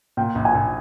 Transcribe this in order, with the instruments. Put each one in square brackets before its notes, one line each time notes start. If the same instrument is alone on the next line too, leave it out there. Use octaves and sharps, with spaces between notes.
[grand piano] A#2 [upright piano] G5
[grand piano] A#1
[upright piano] G#5
[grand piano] A#1